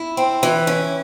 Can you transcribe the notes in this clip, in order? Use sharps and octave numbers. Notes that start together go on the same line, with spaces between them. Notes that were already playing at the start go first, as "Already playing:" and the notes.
Already playing: E4
C4
E3
C#4